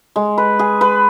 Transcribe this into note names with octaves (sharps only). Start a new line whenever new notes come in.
G#3
B4
G#4
B4